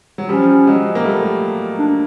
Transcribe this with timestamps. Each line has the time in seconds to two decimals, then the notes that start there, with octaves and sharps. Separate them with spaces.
0.18 F#3
0.29 F3 G3 C#4
0.67 F#3 G#3
0.95 A#3
1.04 G3 A3
1.79 D4